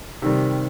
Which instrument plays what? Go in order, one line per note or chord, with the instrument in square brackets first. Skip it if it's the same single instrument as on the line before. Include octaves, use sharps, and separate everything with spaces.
[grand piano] C3 D#3 G3